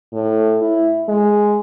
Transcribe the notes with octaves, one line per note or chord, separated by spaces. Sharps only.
A2
E4
G#3